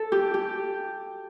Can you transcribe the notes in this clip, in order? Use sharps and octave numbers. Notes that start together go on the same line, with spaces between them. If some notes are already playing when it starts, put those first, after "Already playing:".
Already playing: A4
G4
G4